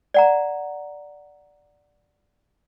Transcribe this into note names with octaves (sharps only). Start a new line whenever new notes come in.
D5 F#5 A#5